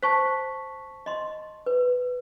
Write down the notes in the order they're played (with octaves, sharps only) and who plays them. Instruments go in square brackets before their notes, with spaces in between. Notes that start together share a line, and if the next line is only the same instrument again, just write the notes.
[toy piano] C5 [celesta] A5 C#6 B6
[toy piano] D#5 C6
B4